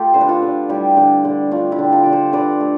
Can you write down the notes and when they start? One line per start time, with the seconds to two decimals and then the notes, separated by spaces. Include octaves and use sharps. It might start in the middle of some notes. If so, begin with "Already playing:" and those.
Already playing: A3 F4 G4 A4
0.14 D3 C5
0.21 B4
0.29 F4 A4
0.42 D3
0.69 G3 E4 G4
0.97 D3
1.25 D3
1.51 A3 D4 F4
1.72 E4 G4
1.79 D3
1.92 F4 A4
2.03 D3 D5
2.13 A4 C5
2.33 D3 B4 D5
2.60 A3